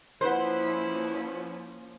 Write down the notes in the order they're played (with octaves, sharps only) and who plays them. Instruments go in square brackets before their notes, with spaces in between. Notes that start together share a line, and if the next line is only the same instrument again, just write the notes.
[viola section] F3 A#3 C#4 [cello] E4 [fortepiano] B4 F#5 [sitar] C5